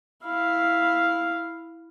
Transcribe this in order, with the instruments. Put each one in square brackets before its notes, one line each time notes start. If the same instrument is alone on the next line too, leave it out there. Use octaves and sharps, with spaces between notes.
[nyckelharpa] E4 F5